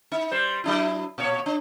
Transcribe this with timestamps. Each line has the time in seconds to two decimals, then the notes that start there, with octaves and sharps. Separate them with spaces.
0.12 D#4
0.31 G3 C5
0.64 F#3 D4 E4
1.18 A#2 C#5
1.46 D4